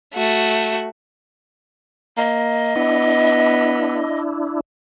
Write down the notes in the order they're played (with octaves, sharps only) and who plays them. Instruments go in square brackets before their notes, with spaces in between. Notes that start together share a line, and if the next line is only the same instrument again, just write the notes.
[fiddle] A3 F#4
[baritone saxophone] A#3 [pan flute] D#5
[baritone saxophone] B3 [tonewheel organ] D4 E4